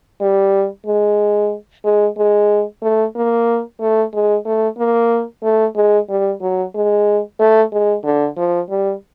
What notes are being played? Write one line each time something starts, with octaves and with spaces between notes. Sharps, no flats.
G3
G#3
G#3
G#3
A3
A#3
A3
G#3
A3
A#3
A3
G#3
G3
F#3
G#3
A3
G#3
D3
F3
G3